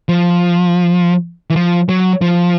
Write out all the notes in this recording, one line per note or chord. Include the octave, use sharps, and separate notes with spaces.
F3
E3
F3
F#3
F3